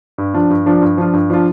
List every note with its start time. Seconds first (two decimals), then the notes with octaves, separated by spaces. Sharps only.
0.18 G2
0.34 F3 D4 F4
0.50 G2
0.66 F3 D4 F4
0.82 G2
0.97 F3 D4 F4
1.13 G2
1.30 F3 D4 F4